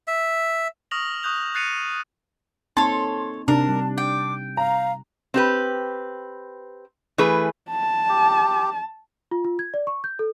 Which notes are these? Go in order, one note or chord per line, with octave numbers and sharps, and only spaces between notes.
E5
C#6 D#6 F6 A#6 F7 F#7
C#6 D#6 F#6 G6 F7
F#6 A6 C7 C#7 D#7 F7
A#3 C4 D#4 A4 C#5 C6
C3 C4 D4 D#4 A#4 A5
G3
G5 D6
F5 A#5
C4 G4 B4
E3 A3 G#4 B4
A5
G4
F4
F4
G#6
D5
C#6
G6
A4